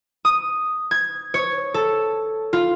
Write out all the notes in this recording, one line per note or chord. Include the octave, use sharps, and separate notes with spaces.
D#6
G#6
C#5
A4
F4